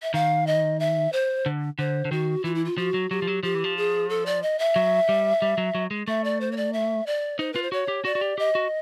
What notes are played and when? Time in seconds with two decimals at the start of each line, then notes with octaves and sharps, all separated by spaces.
0.02 E5
0.14 D#3 F5
0.47 D#5
0.79 E5
1.12 C5
1.46 D3
1.79 D3 C5
2.05 D3
2.11 D#3 F#4
2.44 E3 F4
2.54 E4
2.65 F4
2.78 F3 F#4
2.94 F#3
3.11 F#3 G4
3.22 F3
3.27 F#3
3.43 F3 G4
3.54 E3
3.64 F3
3.77 G#4
4.09 A4
4.26 D5
4.42 D#5
4.59 E5
4.76 F#3
5.09 G3
5.42 G3
5.58 F#3
5.75 F#3
5.91 G#3
6.08 A3 E5
6.24 D5
6.40 C5
6.52 C#5
6.57 D5
6.73 E5
7.06 D5
7.39 D#4 C5
7.53 F4 B4
7.62 C5
7.72 F#4 C#5
7.88 G4
8.05 F#4 D5
8.15 F#4
8.21 G4
8.38 G4 D#5
8.55 F#4